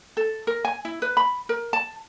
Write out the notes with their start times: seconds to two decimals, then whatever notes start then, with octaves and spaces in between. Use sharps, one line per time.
0.17 A4
0.47 A#4
0.65 G#5
0.85 E4
1.02 B4
1.17 B5
1.49 A#4
1.73 A5